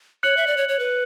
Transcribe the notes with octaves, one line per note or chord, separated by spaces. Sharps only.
C#5 F#6 C#7 F#7
E5
D5
C#5
C#5
B4